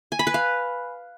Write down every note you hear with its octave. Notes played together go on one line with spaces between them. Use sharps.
G#5
B5
B4
F5